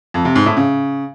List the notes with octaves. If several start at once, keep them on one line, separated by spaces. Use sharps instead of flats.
F2
C3
G#2
A2
C#3